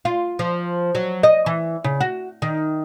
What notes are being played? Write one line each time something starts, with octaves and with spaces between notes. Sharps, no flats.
F4
F3
F#3
D#5
E3
C#3
F#4
D#3